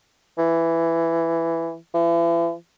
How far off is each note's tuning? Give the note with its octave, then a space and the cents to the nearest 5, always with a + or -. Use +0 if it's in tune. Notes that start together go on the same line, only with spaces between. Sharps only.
E3 +10
E3 +40